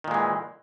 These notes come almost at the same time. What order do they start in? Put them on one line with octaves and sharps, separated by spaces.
D#3 A#2 G#3 E3